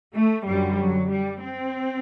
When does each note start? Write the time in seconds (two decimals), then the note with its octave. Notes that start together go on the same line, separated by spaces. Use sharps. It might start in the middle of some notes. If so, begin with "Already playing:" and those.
0.15 A3
0.46 F#2 D3 F#3 G3
0.79 F#3
1.11 G3
1.42 C4